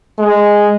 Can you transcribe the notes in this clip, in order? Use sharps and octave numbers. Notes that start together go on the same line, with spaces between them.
G#3